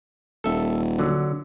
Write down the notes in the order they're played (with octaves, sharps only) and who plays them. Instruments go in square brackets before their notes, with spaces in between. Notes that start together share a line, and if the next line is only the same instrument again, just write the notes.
[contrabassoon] D#1 [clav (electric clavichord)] A4 E5
[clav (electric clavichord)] D3 F#3